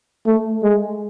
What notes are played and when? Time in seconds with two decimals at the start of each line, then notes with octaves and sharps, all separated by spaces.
0.26 A3
0.63 G#3